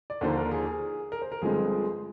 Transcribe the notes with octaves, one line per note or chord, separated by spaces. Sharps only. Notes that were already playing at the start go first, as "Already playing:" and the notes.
D5
D#2 D3 F3 A#3 D4 C5
A#4
G#4
G#4
A#4
C5
A#4
G1 G2 F3 G#3 C4 G#4